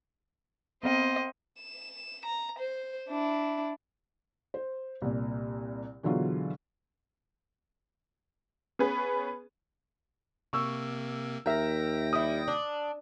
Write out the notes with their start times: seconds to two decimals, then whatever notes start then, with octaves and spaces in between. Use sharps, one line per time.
0.83 B3 C4 C5 D#5 G5
1.61 E7
2.26 A#5
2.59 C5
3.09 D4 E4
4.54 C5
5.02 C2 A#2
6.03 B2 D3 E3 F#3 F4 G#4
8.79 B3 C#4 G#4 B4
10.53 C3 A#3 C#6 E6
11.46 D#2 A#4 E5 G5 A#6
12.13 G3 E4 D#6
12.48 D4